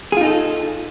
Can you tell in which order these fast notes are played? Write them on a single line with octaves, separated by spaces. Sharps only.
G#4 F4 D#4 A4